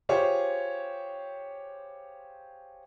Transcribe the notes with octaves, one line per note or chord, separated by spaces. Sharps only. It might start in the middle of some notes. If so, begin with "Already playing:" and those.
F4 G4 G#4 C5 C#5